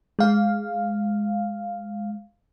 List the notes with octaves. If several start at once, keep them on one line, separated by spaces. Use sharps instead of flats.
G#3 F5